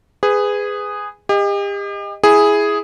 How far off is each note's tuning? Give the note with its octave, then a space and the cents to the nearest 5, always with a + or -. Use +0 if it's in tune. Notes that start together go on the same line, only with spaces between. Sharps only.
G#4 -10 B4 +20
G4 +40 D#5 +0
E4 +0 G#4 +0